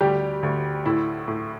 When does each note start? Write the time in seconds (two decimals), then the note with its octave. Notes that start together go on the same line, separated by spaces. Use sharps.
0.01 D2 G3 G4
0.43 D2
0.86 A2 E4
1.28 A2